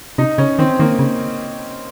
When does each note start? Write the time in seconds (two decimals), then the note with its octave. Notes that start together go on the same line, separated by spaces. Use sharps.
0.18 C3 D#4
0.38 C#3 C#4
0.59 D#3 C4
0.80 D#3 A#3
0.99 C#3